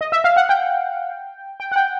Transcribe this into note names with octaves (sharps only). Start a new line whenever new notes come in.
D#5
E5
F5
F#5
G5
G5
F#5
G5